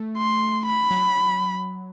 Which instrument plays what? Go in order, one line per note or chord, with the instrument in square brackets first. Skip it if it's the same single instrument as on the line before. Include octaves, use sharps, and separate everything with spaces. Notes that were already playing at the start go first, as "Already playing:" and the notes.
Already playing: [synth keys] A3
[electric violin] C6
B5
[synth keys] F#3